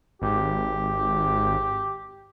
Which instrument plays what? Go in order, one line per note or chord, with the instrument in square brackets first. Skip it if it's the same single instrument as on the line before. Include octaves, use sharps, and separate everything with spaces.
[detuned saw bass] G#1 [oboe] G4